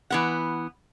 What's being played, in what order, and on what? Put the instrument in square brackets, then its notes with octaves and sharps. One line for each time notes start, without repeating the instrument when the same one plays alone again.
[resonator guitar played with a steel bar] E3 B3 F#5